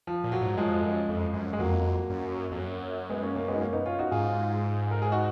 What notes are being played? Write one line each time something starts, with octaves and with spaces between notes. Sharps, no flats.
F3
A#2
F#3
G#2
F#2 F3 G#3
F2
F#2
F2
F#2
G#3
F2 F#3 A#3
F#2
F2
F#2
G#3 B3
A#3 C#4
A#3 C#4
G#3 B3
D#4
A#3 C#4
B3 D#4
C#4 F4
D#4 F#4
G#2 F4 G#4
A#4
G#4
D#4 F#4